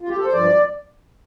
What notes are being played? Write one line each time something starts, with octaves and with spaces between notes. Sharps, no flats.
F4
G4
A4
C5
G2 F3 D5